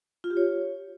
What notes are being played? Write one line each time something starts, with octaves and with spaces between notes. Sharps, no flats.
F4
G4
C#5